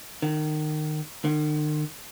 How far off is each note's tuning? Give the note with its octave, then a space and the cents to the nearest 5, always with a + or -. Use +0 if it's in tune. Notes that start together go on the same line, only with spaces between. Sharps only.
D#3 -25
D#3 -45